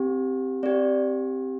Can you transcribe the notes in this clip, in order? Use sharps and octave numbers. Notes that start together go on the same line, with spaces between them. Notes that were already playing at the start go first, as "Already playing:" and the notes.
Already playing: C4 G4
C4 G4 D5